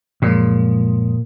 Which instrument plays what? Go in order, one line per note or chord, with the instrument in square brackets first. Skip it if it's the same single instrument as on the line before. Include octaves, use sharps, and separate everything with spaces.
[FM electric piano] F#2 F3 G#3 [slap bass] A#2